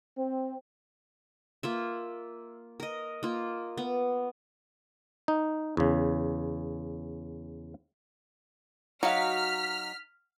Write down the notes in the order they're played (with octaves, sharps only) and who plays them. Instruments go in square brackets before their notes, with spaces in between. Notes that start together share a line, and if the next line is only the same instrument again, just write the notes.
[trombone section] C4
[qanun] A#3 F4 E5
A#4 D#5
A#3 F4
B3
[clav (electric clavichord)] D#4
E2 C#3
[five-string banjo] F#3 [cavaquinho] D#4 F#4 F5 [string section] F6 B6